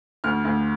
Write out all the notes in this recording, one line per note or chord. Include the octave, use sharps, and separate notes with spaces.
D2 F6
D2